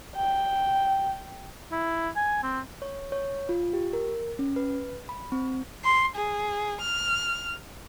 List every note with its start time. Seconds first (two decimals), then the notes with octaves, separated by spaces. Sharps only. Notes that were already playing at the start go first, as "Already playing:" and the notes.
0.16 G5
1.72 E4
2.16 G#5
2.43 C4
2.82 C#5
3.12 C#5
3.49 F4
3.73 G4
3.93 A#4
4.39 C#4
4.56 B4
5.09 B5
5.32 C4
5.85 C6
6.16 G#4
6.81 F6